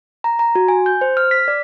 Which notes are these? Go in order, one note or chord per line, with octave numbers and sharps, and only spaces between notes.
A#5
A#5
F#4
G#5
G6
C5
F6
B6
D5